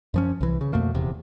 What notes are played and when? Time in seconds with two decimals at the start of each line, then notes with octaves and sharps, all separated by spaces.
0.14 F#2 F3 C#4
0.41 C2 E3
0.61 C#3
0.73 F2 B2 A3 A#3
0.94 D#1 E2 C3